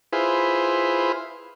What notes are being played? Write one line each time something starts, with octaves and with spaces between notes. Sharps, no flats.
E4 F4 G#4 B4 C5